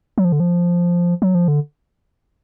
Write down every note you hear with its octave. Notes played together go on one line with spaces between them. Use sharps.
F#3
F3
D3
F3
F#3
F3
D3